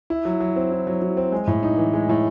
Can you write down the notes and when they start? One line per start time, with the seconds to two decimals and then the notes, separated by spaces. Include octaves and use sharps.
0.10 E4
0.25 F#3
0.40 F#3
0.56 C4
0.71 E4
0.87 F#3
1.02 F#3
1.17 C4
1.32 G#3
1.47 A2
1.63 D#4
1.78 E3
1.93 G#3
2.09 A2